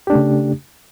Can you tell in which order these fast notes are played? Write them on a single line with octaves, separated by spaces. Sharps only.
G4 D4 A3 C#3